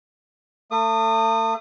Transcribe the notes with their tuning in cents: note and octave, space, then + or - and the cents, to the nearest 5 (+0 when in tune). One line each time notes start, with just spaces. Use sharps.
A3 +40 D#6 -30